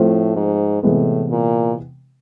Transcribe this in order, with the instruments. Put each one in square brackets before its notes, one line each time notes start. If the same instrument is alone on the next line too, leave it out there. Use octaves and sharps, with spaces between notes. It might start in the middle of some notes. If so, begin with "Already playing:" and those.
Already playing: [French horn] A2 [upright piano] F3 A3 C4
[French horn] G#2
[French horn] A2 [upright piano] C3 E3 G#3 B3
[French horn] A#2